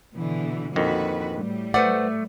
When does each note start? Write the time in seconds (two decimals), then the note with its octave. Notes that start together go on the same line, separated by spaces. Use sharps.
0.16 B2 D3 E3
0.76 A#1 F2 D#3 F#4 B4
1.34 A2 G3
1.74 A3 B4 C5 D5 F#5